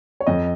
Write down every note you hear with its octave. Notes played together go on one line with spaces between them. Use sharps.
C#5
F2 D#5